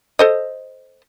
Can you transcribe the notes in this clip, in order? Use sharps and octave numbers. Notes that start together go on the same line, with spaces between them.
A4 C5 D#5